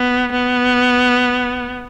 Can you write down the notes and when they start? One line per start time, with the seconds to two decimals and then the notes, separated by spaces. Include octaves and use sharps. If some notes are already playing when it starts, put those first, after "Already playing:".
Already playing: B3
0.33 B3